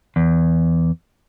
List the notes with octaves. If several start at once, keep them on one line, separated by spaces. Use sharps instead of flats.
E2